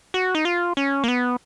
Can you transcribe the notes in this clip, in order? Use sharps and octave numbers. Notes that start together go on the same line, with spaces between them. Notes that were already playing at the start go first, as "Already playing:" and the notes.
F#4
D#4
F4
C#4
A#3
B3